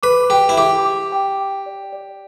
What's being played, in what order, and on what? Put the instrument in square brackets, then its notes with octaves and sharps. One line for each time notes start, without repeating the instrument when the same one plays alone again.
[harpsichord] B4 [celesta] D6
[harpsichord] G4 [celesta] G5
[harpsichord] E4
[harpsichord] G4 [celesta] D6
[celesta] D6
G5
G5
D5
D5